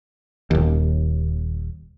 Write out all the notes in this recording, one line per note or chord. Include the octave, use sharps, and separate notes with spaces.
D#1 D#2